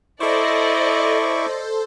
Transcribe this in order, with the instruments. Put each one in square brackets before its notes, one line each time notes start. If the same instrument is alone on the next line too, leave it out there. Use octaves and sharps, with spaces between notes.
[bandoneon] E4 C#6 D6 [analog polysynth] A4 C5 [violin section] D5 D#5